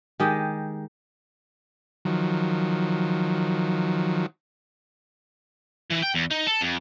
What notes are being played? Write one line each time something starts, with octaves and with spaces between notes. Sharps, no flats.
D#3 G#3 G4 D#5
D#3 F3 F#3
E3
G5
E2
D#4
A4
F2